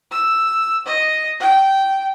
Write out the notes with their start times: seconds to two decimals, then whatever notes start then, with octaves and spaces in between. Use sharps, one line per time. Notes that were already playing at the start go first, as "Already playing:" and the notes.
0.11 E6
0.86 D#5
1.40 G5